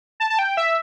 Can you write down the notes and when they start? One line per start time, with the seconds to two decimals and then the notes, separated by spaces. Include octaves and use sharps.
0.20 A5
0.30 A5
0.39 G5
0.57 E5